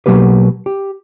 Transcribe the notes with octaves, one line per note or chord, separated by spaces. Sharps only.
B2 F3 F#3 A#3 G4 B4
G4